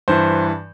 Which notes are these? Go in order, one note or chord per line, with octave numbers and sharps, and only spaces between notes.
G2 E3 C5